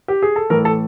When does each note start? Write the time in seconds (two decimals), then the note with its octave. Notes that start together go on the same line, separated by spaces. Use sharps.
0.08 G4
0.22 G#4
0.36 A4
0.50 A2 E3 A3 A#4
0.65 A4